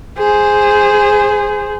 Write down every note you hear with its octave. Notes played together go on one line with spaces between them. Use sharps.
G#4 C5